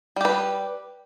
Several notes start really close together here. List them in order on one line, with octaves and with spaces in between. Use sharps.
G3 G4 B4